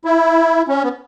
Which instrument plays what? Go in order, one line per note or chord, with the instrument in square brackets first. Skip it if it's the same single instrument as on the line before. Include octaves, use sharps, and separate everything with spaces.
[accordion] E4
C#4
B3